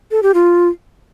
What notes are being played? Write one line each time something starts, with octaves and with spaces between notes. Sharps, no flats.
A4
G4
F4